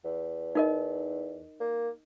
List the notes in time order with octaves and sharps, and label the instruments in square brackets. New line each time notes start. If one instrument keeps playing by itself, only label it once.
[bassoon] E2
[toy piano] D#4 A#4 D#5
[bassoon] A#3